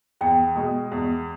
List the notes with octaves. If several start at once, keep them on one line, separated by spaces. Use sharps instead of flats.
E2 G5
B2 G#3
E2